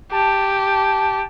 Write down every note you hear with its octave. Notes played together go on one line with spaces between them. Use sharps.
G4 A5